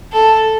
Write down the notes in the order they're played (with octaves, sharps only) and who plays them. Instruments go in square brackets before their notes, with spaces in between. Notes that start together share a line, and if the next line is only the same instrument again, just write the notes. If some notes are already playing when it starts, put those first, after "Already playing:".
[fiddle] A4